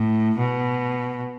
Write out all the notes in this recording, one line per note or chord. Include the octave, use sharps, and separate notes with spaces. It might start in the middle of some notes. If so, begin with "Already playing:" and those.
Already playing: A2
B2